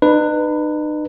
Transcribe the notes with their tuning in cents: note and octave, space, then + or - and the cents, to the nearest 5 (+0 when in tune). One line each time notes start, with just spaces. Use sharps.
D#4 -40 B4 +0